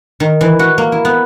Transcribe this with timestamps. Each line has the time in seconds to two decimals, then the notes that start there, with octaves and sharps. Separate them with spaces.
0.20 D#3
0.41 E3
0.59 F#4
0.78 A#3
0.92 E4
1.05 B3